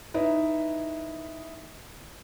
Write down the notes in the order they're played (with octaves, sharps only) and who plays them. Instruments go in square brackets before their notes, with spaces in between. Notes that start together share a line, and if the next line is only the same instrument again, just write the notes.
[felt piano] D#4 E4 B4